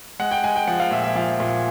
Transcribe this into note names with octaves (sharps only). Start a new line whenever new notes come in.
G#3 F#5
G5
G#3 G#5
G5
F3 F#5
F5
A#2 E5
E5
F3 F5
A#2